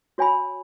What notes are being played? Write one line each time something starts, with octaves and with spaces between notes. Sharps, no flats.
F#4 C#5 G#5 B5